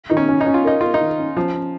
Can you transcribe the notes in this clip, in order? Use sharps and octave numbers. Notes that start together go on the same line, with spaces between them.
D#3 D#4
C#4
C#4
D#4
C#4
F4
D#4 A#4
F4 A#4
D#4
D#3
C#4
F3 C#4
C#4